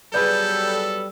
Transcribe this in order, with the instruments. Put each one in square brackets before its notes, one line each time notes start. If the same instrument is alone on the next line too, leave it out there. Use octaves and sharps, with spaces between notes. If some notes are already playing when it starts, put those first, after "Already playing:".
[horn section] F#3 B3 A4 [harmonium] G3 [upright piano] G#4 B4 D5 [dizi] G6